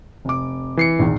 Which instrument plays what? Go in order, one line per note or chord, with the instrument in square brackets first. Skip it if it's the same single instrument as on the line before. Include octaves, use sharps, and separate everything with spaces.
[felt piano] F1 D6
[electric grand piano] E3 C7 C#7
[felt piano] A#1 E2 D#3